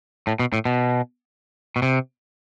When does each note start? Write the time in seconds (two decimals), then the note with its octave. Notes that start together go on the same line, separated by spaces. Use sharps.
0.27 A2
0.39 B2
0.53 A2
0.65 B2
1.76 B2
1.82 C3